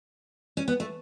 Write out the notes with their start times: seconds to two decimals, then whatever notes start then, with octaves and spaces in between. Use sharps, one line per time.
0.57 C#4
0.68 B3
0.80 A3